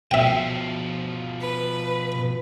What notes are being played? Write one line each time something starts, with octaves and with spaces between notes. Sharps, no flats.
B2 F3 E5 G5
B4